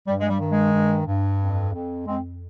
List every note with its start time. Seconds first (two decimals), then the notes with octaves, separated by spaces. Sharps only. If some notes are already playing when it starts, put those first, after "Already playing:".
0.07 G2 G3
0.20 G#3
0.29 G3
0.41 D#3
0.52 G#3
0.73 G2
1.07 G2
1.41 F2
1.74 F2
2.06 F2 G#3 C4